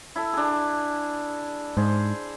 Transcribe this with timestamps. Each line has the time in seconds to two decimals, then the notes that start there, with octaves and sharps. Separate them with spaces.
0.16 E4 A4
0.33 D4 G#4
1.77 G#2 G#4 C5